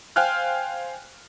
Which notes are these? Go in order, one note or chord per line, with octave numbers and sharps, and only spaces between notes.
C5 F5 G5 G#5 F6 F#6